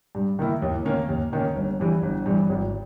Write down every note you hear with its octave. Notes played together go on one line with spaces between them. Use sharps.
G2
D#3 A#3 E4
D#2
D#3 A#3 C#4
D#2
D#3 A#3 C#4
G1
G2 E3 G3
G1
G2 E3 G3
G#1